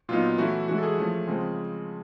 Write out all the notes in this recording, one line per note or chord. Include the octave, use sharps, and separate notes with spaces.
A#2 F#3 B3 D#4 F4
E3 A3 C#4 E4 F#4
E3 G#3 C#4 E4 F#4
A4
G#4
F3 A3 C#4
C#3 F3 G#3 C4